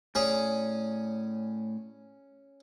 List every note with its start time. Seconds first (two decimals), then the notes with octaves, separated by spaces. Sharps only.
0.15 A2 C#4 G#4 C#5 D5